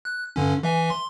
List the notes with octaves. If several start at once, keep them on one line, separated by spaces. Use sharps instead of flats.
F#6
G2 D3 C#4
E3 E5 G#5
C6